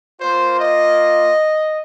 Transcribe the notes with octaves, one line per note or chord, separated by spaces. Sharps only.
A#3 F4 C5
D#5